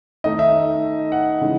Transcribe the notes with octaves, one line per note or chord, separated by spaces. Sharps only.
D#3 A3 D#4 D#5
E5
F#5
C#3 E3 G#3 D#4